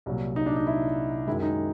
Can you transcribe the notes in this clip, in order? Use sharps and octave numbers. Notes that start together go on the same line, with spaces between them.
C2 A#2 F#3
D#4
D4
D#4
E4
F#2 D#3 G#3 E4
D#4